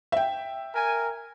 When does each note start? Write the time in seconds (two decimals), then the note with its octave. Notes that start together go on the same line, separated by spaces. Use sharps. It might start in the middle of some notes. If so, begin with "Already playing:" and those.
0.12 E5 G5
0.74 A#4 G#5